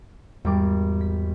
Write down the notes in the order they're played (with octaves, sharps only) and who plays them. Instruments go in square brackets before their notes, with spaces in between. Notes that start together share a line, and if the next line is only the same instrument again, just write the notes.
[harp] G#1 G3 D6 [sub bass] E2
[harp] B6